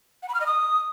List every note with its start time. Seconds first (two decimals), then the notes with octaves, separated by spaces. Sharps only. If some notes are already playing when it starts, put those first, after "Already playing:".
0.23 F#5
0.29 B5
0.34 F6
0.40 D#5
0.46 D#6